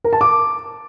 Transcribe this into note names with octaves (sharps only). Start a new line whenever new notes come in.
A#4
A5
D6